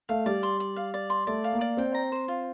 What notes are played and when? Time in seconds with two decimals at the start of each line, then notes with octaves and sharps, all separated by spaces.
0.09 A3 F5
0.26 G3 D5
0.43 C6
0.60 D5
0.76 F5
0.94 D5
1.10 C6
1.27 A3 D5
1.44 F5
1.53 A#3
1.61 D5
1.77 C4 G5
1.94 A#5
2.12 C5
2.28 F4